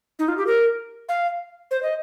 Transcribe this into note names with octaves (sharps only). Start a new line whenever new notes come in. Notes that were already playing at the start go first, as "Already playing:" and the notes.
D#4
F4
G4
A#4
F5
C5
D#5